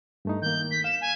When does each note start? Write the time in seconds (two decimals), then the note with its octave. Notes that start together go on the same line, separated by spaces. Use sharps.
0.25 G2 A3 D#4
0.42 D#3 A#3 G6
0.71 B6
0.84 F5 E7
1.01 G#5